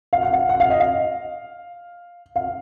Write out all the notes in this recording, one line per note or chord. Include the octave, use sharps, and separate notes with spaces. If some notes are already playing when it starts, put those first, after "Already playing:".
F5
F#5
F5
F#5
F5
D#5
F5
F5